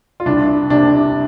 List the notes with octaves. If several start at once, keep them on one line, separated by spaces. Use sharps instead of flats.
F4
C2 D4
C3 D4